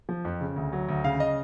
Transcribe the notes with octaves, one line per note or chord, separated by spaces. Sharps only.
F3
F2
C#3
D2
F#3
D2
C#3 F5
D#5